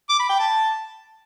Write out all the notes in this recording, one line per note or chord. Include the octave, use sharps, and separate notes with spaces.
D6
B5
G5
A5